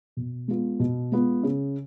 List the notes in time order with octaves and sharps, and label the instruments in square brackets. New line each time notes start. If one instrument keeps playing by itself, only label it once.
[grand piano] B2
G#3 B3 F4
B2
G#3 B3 F4
C#3